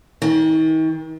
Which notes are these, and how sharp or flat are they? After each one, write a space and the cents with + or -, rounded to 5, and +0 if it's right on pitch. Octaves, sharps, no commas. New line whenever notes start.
D#3 +40